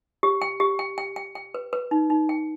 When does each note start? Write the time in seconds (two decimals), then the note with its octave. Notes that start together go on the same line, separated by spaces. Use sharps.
0.23 G4
0.42 G5
0.60 G4
0.79 G5
0.98 G5
1.16 G5
1.35 G5
1.54 B4
1.73 B4
1.91 D#4
2.10 D#4
2.29 G5